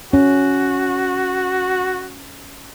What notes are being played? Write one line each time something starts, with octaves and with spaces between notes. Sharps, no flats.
C#4 F#4